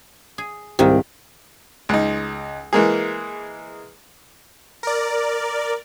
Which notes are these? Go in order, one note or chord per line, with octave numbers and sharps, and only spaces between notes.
G#4
C2 G#2 D#3 G4 F5
C#2 D#4
E3 G#3 A#3 G#4
A#4 D5